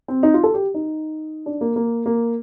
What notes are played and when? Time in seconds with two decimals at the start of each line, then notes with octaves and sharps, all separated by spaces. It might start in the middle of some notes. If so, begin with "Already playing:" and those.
0.08 C4
0.23 D#4
0.34 F4
0.43 A4
0.54 G4
0.74 D#4
1.46 D4
1.61 A#3
1.76 A#3
2.06 A#3